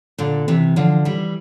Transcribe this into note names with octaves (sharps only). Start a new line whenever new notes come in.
A#2 D3
C3 E3
D3 F3
E3 G3